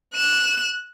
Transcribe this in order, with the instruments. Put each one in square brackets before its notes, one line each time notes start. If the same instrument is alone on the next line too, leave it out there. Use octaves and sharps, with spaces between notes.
[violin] F#6 E7